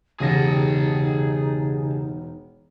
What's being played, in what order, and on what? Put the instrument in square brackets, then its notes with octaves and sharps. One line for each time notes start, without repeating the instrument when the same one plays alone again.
[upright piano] E1 A#6 [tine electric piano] C#3 G4 F#5 [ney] D#4 [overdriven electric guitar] G#4 A5